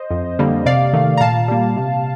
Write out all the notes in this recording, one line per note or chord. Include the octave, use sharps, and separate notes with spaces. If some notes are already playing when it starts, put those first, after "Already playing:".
Already playing: C5 D#5
F2
D3 G3 A#3
C3 D5 F5
D#3 A3
A#5
A#2 F5 A5
G3 A#3
C3